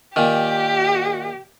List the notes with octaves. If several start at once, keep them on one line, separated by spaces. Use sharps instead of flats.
A#2 D#3 G4